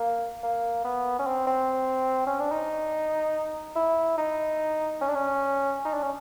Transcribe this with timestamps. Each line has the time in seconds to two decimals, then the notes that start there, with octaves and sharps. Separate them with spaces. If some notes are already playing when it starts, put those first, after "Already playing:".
Already playing: A#3
0.43 A#3
0.85 B3
1.19 C#4
1.27 C4
1.47 C4
2.27 C#4
2.40 D4
2.52 D#4
3.76 E4
4.18 D#4
5.01 C#4
5.08 D4
5.15 C#4
5.85 D#4
5.93 D4
6.02 C#4